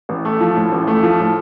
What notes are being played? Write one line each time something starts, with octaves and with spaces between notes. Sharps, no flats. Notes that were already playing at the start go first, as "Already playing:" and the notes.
A1
A3
F3
A2
A1
A3
F3
A2